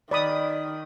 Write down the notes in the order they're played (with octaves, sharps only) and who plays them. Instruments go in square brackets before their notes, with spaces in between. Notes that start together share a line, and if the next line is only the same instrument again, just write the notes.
[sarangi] D#3 [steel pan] D5 B5 D#6